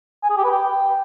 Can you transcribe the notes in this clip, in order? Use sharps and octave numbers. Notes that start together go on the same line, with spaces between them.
G#5
G#4
G4
B4
G5